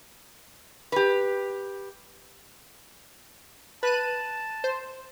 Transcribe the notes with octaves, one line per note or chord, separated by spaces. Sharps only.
G4 B4
B4 A5 F#6 D#7
C5